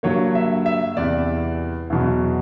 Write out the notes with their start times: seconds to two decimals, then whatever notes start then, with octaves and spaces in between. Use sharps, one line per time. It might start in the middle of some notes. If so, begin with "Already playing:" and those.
0.03 G2 D3 F#3 A#3 C#5
0.35 E5
0.66 E5
0.97 E2 C3 E3 D5
1.90 E2 B2 F#3